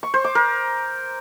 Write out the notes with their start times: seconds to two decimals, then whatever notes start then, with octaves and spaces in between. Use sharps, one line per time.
0.03 C#6
0.14 C5
0.24 D6
0.35 A#4